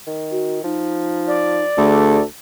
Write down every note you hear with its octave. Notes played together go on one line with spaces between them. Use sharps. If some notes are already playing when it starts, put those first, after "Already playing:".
D#3
F#4
F3 D#4
D5
D2 G#4 A4